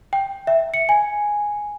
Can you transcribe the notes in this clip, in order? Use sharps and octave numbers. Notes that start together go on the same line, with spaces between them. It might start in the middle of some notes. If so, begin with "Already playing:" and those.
G5
E5
C#7
G#5